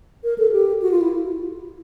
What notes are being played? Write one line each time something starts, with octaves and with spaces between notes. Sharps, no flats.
A#4
A4
G4
F#4
F4
E4